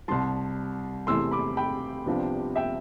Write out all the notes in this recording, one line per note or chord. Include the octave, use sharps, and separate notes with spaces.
C2 C3 G3 A5 C6
E2 C3 E3 A3 C6 E6
B5 D6
G5 B5
C2 C3 F3 B3 D4
E5 G5